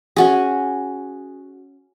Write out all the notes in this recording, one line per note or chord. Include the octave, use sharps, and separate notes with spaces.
C#4 F#4 G#4